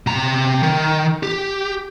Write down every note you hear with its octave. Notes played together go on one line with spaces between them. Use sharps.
C3 A#5
D#3
G4